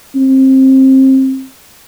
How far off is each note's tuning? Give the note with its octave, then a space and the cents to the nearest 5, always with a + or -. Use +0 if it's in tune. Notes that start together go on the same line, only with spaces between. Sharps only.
C4 +25